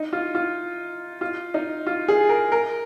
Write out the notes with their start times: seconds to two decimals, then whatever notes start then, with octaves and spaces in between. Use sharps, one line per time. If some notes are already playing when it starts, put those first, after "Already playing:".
Already playing: D#4
0.13 F4
0.35 F4
1.21 F4
1.54 D#4
1.87 F4
2.08 G#4
2.29 A#4
2.52 A#4